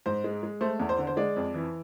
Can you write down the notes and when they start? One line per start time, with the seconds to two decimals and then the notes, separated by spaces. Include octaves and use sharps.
0.06 G#2 C5
0.24 G#3
0.43 G#3
0.61 A3 C5
0.80 E2
0.89 C5
0.98 D3
1.07 C5
1.17 G#3 D5
1.36 F2
1.54 E3